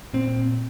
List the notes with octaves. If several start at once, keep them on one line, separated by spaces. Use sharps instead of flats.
A#2 C4